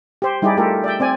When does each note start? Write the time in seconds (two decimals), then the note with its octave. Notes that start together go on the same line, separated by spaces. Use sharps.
0.22 G4 C5
0.42 G3 D#4 E4 G4 G#4 D5
0.57 A3 F4 G4 A4 A#4
0.84 D5 E5 G5
1.00 C4 D5 G#5